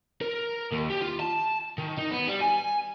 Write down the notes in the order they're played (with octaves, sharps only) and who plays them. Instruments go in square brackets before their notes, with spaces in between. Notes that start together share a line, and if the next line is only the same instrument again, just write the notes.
[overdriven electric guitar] A#4
D#2
G4
F4
A5
D#3
D#4
B3
G3
G#5